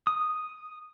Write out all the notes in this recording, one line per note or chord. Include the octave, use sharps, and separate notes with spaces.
D#6